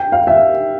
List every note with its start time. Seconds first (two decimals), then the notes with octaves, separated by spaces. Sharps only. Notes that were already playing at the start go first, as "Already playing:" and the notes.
Already playing: G5
0.12 F5
0.27 E5